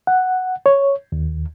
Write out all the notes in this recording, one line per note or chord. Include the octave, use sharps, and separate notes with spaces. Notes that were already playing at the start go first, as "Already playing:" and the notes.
F#5
C#5
D#2